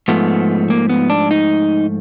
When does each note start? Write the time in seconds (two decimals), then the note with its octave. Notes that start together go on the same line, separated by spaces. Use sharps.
0.08 G#2 F3 A3 B3
0.70 A#3
0.89 B3
1.10 D4
1.31 D#4